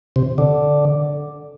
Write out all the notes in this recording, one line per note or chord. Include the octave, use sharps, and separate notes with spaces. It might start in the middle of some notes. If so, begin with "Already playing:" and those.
C3
D3